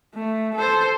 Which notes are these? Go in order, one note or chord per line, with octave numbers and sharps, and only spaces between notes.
A3
A4 C5